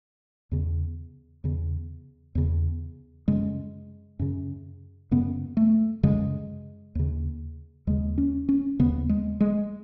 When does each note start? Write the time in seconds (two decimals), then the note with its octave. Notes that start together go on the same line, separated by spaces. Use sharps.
0.52 E2 C#3
1.44 E2 C#3
2.35 E2 C#3
3.28 F#2 C#3 G#3
4.19 F#2 C#3
5.11 F#2 C#3 B3
5.57 A3
6.03 F#2 C#3 G#3
6.95 D#2 C#3
7.87 D#2 C#3 G#3
8.18 C#4
8.49 C#4
8.79 D#2 C#3 B3
9.09 G#3
9.41 G#3